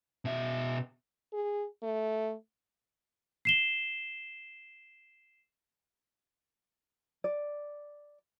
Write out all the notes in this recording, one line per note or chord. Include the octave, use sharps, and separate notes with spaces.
B2 E5
G#4
A3
C7 E7 G7
D5